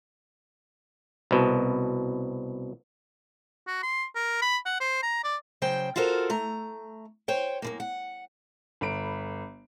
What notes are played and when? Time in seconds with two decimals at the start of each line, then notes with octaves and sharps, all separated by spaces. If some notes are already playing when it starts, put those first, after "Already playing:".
1.31 C2 B2
3.67 F#4
3.83 C6
4.15 A#4
4.42 B5
4.66 F#5
4.80 C5
5.03 A#5
5.24 D5
5.62 C#3 F#3 C5 G5
5.96 F4 F#4 A4 A#4 C5
6.30 A3 A#5
7.28 C5 C#5 G5
7.62 F#2 B2 A#3
7.80 F#5
8.81 G1 B5 D7